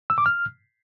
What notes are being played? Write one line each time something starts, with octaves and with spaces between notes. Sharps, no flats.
E6
D6
F6